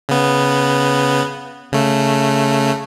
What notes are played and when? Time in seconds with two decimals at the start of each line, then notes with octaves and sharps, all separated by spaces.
0.09 C#3 B3
1.72 C#3 A3